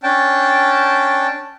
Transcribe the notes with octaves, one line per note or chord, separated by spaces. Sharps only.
C#4 D4 G5 A5